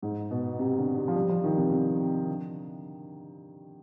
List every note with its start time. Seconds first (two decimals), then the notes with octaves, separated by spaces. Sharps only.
0.02 G#2
0.31 B2
0.59 C3
0.78 D3
0.97 C3
1.08 F3
1.16 G3
1.29 F3
1.44 D#3
1.57 C3
1.72 C3
2.28 D3